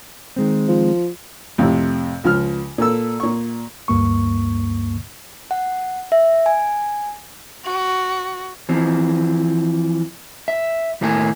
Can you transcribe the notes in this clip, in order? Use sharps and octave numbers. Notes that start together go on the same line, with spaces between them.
D#3 G#3 C4
F3
F2 A2 C3
C#2 F3 F6
A#2 A#3 A4 E6
A#2 C#6
D2 G2 A#3 C#6
F#5
E5
G#5
F#4
E3 F3 C4
E5
D#2 A2 A3 A#3 B4 G#5